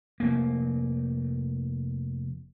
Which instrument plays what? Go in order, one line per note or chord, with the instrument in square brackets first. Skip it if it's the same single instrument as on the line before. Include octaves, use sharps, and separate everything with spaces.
[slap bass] F1 A#3